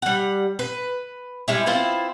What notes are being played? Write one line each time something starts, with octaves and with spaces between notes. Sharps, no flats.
G3 F#5
B4
G3 G#3 E4
B3 C4 E4 F4